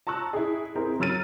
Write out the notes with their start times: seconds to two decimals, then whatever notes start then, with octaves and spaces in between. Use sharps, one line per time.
0.07 A5 A#5 C#6 E6 F#6
0.33 E4 G#4
0.75 C4 E4 G#4 A#4
1.00 F#3 E6 F6 A6 D#7